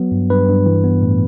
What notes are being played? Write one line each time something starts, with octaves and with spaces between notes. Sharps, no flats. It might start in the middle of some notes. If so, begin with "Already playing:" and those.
Already playing: F#3 B3
G2
G2 B4
G2
E3
B3
A2